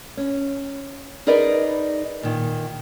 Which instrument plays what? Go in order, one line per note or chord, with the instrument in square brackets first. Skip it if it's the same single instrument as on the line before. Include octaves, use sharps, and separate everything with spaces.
[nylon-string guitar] C#4
D#4 G#4 A#4 B4 D5 D#5
A#2 D#3